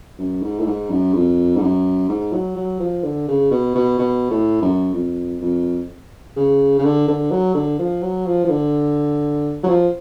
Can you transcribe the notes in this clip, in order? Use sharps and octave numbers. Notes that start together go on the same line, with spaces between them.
F#2
G#2
A2
G#2
F#2
F2
G#2
F#2
G#2
F#3
F#3
F3
D3
C#3
B2
B2
B2
A2
F#2
F2
F2
C#3
C#3
D3
D3
F#3
D3
F3
F#3
F3
F3
D3
F#3
F3